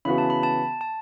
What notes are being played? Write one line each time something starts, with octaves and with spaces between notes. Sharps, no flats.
C#3 E3 B3 F#4 B5
A5
B5
A5
A5